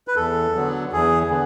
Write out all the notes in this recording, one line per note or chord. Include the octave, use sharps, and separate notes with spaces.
B4
E2 A4
D3 F#3 B3
E2 G#4
D3 B3